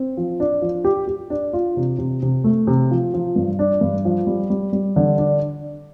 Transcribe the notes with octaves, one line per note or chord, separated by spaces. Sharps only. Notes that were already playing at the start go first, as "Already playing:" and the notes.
Already playing: C4
F3
D4
F3
G4
G4
D4
F4
C3
C3
C3
A3
C3
F3
F3
G2
D4
G2
F3
G3
G3
G3
D3
D4